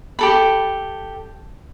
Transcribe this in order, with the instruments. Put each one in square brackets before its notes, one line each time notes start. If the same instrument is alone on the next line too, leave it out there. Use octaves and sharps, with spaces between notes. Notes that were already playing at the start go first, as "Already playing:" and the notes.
[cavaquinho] G4 A4 B5